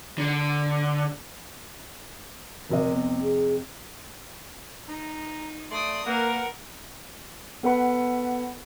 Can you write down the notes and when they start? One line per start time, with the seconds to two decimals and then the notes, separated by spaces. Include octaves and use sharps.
0.18 D3
2.69 F1 C3 A#4 D#5
2.93 B3
3.22 G#4
4.88 D#4 A#5
5.71 A3 D5 C6 D#6
6.06 A#3 A#4 B4 F#5
7.63 B3 A4 B4 F#5 B5